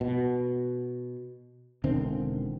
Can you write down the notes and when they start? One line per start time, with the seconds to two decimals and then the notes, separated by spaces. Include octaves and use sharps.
0.01 B2
1.84 E1 D3 D#3 C4